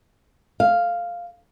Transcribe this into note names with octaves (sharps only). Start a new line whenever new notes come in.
F5